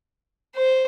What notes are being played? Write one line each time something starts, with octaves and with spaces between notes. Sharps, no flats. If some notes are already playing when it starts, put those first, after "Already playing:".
C5